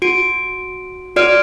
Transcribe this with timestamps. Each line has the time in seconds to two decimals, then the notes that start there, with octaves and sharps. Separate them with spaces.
0.02 F#4 D7
1.16 F#4 D5 F6 D7